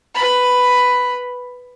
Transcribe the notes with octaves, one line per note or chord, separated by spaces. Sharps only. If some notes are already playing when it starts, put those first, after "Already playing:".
B4 B5